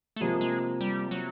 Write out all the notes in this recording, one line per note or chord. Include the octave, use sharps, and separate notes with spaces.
A3
C3 F3 G#3 A#3
G#3
G3
F#3